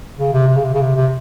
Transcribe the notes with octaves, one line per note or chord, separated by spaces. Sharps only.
C#3
C3
C3
C#3
C3
C#3
C3
C3